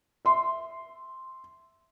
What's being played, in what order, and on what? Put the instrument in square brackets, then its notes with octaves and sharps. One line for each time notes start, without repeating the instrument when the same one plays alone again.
[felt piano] E5 C6